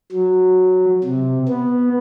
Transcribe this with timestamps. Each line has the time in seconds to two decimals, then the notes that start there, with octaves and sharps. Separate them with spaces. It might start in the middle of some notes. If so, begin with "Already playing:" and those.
0.12 F#3
1.04 C3
1.48 B3